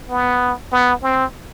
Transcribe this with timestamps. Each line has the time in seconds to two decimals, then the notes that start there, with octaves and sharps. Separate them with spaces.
0.09 B3
0.72 B3
1.03 C4